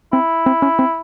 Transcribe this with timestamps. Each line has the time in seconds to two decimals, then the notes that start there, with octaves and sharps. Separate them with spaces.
0.13 C4 E4
0.46 C4
0.62 C#4
0.79 C4